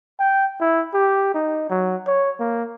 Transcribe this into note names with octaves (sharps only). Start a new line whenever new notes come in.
G5
E4
G4
D#4
F#3
C#5
A#3